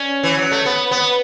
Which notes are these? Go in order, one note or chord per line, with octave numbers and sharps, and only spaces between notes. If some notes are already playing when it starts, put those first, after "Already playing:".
Already playing: C#4
E3
F#3
A3
B3
B3